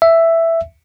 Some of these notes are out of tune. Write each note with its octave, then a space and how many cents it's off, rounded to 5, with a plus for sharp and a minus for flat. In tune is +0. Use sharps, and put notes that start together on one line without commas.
E5 +5